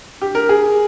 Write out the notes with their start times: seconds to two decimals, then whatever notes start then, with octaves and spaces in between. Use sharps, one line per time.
0.22 G4
0.35 A#4
0.49 G#4